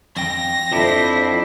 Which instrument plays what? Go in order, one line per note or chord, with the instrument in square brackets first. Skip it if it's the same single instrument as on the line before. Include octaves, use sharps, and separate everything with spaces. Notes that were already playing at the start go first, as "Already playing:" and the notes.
[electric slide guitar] F2 G5 [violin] A#6
[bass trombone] F2 [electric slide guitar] F3 D4 [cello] E4 C5